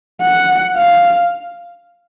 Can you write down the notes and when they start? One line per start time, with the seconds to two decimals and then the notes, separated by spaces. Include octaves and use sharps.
0.22 F#5
0.77 F5